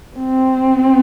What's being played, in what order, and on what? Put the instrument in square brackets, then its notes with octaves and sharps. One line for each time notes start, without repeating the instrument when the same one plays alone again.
[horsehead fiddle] C4